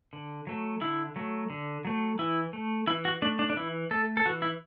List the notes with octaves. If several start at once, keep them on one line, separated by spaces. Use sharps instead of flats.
D3
F#3 A3
D3 E4
F#3 A3
D3
F#3 A3
E3 E4
A3
E3 E4
F#4
A3 D4
D4
D4
E3 E4
A3 A4
A4
E3 F#4
E4